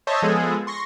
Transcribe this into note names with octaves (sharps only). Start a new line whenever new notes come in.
C5 C#5 D#5 E5 A5
F3 G#3 B3 G#4 A4
C6 C#6 A#6